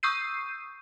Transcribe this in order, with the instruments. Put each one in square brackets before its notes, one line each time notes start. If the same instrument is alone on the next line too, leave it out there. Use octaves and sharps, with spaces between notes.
[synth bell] C#6 D#6 E6 G6 C7 D#7